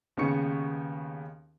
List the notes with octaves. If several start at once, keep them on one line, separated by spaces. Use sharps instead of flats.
D#2 C#3 B3 D#4 C#6 C#7